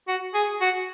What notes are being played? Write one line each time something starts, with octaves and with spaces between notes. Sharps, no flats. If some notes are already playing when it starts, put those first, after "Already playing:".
F#4
G#4
F#4